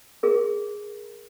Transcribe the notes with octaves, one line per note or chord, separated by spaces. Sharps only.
G#4 A#4